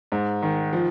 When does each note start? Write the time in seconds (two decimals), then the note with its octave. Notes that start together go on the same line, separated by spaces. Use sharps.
0.12 G#2
0.42 D#3
0.73 F3